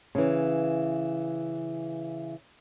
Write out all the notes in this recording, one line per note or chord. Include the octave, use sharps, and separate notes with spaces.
C#3 E3